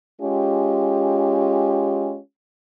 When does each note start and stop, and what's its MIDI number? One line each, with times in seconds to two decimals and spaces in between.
0.20 2.17 56
0.20 2.17 61
0.20 2.17 65
0.20 2.17 67